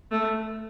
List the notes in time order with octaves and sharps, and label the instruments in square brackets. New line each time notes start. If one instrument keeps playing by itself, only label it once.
[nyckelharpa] A3